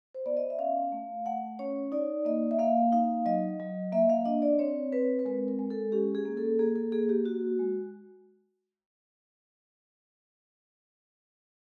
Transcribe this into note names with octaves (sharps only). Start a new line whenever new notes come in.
C5
B3 D5
D#5
E5
C#4 F5
A3
A3 F#5
C#4 C#5
D#4 D5
A#3 D#5
E5
A#3 F5
D#4 F5
F#3 D#5
F#3
A#3 E5
F5
D4 D#5
D5
C4 C#5
C4 B4
B4
G#3 A#4
A#4
G#3
A4
C#4 G4
G#4
A#3
A4
A#3 G#4
A4
A#3 G#4
G4
F#4
G#3